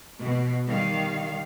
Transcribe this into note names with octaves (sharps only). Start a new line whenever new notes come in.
B2
D#3 G3 F5